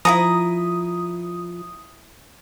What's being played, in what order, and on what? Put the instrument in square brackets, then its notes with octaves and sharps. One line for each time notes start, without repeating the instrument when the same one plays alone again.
[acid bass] F3 [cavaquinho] E4 F#4 A#5 [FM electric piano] D#6